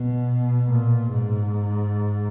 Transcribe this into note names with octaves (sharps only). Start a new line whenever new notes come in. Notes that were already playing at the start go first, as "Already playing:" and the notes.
Already playing: B2
A#2
G#2